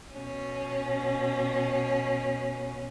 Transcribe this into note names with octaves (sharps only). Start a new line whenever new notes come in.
B2 C#4